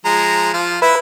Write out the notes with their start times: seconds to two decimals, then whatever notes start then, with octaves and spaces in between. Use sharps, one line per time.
0.05 F3 G#3 A#5
0.54 F3 F4
0.82 E4 B4 E5